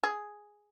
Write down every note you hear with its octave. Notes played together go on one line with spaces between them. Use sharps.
G#4